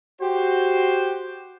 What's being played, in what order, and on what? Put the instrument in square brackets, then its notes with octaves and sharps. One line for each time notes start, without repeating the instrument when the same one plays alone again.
[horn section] F#4 G4 C5